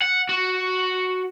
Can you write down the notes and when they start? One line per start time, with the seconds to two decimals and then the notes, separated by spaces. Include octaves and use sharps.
0.02 F#5
0.29 F#4